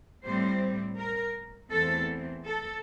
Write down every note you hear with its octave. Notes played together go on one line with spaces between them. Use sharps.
A2 G3 C4 C5
A#4
E2 E3 A3 C4 A4
A4